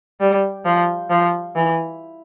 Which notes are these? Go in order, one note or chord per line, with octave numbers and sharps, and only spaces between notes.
G3
F3
F3
E3